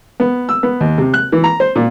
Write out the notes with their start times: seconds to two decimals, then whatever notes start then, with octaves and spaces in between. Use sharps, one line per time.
0.20 B3
0.49 E6
0.63 B3
0.81 D#2
0.98 C3
1.14 F#6
1.32 E3
1.44 A#5
1.60 C5
1.76 A#2